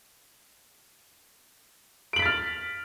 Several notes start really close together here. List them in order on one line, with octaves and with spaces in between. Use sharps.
D7 F#7 B6 A6 F6